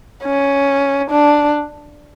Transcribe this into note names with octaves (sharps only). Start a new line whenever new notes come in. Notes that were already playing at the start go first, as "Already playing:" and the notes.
C#4
D4